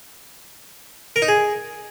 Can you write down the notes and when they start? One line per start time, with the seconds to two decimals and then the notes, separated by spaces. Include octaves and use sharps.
1.16 A#4
1.22 D#4
1.28 G#4